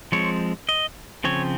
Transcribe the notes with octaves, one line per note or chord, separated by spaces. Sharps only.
F3 G#3 C4 C#5
D#5
C#3 F3 C4 C#5